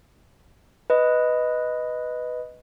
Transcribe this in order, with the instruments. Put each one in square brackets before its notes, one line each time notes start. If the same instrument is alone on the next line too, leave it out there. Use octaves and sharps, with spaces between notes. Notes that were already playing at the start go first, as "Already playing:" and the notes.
[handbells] B4 D#5